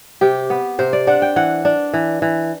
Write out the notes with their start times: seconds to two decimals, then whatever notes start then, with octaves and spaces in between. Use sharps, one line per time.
0.21 C3 G4
0.50 B3
0.79 C3 C5
0.93 D5
1.07 D4 F#5
1.22 G5
1.36 E3 F#5
1.65 D4
1.94 E3
2.22 E3